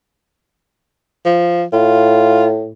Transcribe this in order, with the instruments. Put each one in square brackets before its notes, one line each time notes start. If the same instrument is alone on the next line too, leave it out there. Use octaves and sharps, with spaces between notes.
[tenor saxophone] F3
[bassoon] A2 [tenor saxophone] F4